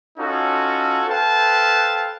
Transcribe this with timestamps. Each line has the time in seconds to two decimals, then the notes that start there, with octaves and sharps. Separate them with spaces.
0.19 C#4 D#4 F4 F#4 A4
1.09 A4 B4 C5 F5 G5 A5